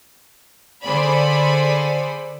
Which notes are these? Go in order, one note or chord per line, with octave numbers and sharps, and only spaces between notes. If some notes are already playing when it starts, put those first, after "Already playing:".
D3 G#4 C5 D5 B5